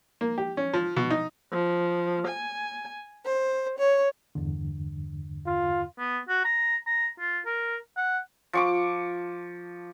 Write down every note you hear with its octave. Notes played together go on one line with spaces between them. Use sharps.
A#3
G4
C#4
F3
B2
D#4
F3
G#5
C5
C#5
E2 G2 D3
F4
B3
F#4
A#5
A#5
F4
A#4
F#5
F3 C#6 D6